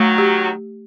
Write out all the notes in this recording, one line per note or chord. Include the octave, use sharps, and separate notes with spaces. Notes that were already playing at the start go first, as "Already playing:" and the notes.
Already playing: D#3 F#3 A3
G4